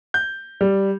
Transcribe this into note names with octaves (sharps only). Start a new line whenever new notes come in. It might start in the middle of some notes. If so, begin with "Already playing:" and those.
G6
G3